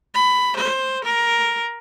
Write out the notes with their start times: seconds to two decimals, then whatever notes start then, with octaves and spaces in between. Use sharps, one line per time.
0.15 B5
0.56 C5
1.05 A#4